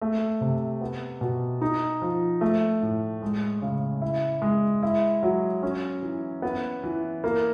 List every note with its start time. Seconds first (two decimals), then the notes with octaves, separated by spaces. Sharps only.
0.01 A3
0.41 C3
0.81 B3
1.21 B2
1.61 D#4
2.02 F3
2.41 A3
2.82 A2
3.22 G#3
3.62 C#3
4.02 E4
4.42 G#3
4.83 E4
5.23 F#3
5.63 C#4
6.02 E3
6.42 B3
6.83 E3
7.24 A#3